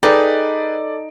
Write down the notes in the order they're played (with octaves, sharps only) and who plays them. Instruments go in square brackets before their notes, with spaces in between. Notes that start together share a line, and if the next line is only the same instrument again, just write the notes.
[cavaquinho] D#4 [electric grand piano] G#4 B4 G5 [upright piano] A4 [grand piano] D5